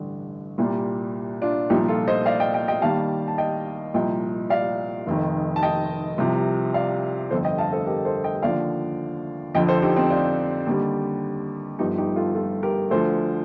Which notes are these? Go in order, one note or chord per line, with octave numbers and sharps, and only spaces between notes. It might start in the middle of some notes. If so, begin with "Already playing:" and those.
Already playing: A1 G2 D3
C2 A#2 G3
D4 F4
C2 A#2 F3 D#4 G4
F4 A4
C5 D#5
D5 F5
D#5 G5
D#5 G5
D#5 G5
D#2 D#3 G3 F5 A5
A5
D#5 G5
C2 A#2 F3 D#5 G5
D5 F5
F1 F2 D#3
A5
D#5 G5
C2 C3 F3
D5 F5
G1 F2 D3 A4 C5
D#5 G5
F5 A5
A4 C5
G4 A#4
A4 C5
D#5 G5
D#2 D3 F3 D5 F5
F2 D3 F3 D#5 G5
A4 C5
D#4 G4
C4 D#4
D4 F4
D#2 D3 G3
G1 G2 F3 D#4 G4
D#4 G4
F4 A4
F4 A4
G4 A#4
D2 D3 F3 A4 C5